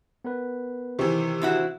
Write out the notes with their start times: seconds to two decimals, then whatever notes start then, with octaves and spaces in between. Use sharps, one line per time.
0.25 B3 A#4 B4
0.99 C3 D#3 E3 C5 C#6
1.41 C4 E4 F#4